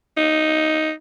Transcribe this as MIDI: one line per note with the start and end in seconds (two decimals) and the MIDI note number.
0.17 0.91 63